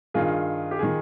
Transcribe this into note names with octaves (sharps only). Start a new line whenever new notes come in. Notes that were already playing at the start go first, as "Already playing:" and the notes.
G2 D#3 F4 G#4
G4
D#3 F4 G#4